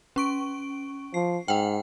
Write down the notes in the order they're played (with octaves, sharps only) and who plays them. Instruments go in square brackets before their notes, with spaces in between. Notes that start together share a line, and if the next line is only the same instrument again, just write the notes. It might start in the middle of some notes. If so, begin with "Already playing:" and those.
[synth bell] C#4 C#6 D7
[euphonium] F3 [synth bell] C7
[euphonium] G#2 [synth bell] F#5 G5